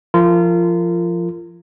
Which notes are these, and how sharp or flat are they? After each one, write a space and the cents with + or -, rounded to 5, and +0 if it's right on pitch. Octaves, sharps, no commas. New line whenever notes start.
F3 -10 F4 -25 A#4 -30